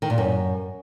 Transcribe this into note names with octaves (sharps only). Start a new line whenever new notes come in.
D#3
A#2
F#2